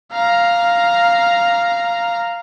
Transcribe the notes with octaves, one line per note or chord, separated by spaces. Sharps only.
F5 A#5